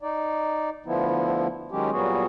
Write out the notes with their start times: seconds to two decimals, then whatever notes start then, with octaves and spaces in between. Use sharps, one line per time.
0.02 D#4 D5
0.86 D2 D3 F3 B3 E4
1.72 D#3 F#3 G#3 C#4 G4
1.91 A#2 F#3 G3 B3 F#4 G#4